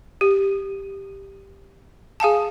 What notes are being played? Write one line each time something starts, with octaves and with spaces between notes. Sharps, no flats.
G4
G#4 F5 G#5 A5